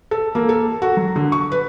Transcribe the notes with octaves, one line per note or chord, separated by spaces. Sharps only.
A4
A#3
A4
F#4
F#3
D3
C#6
B4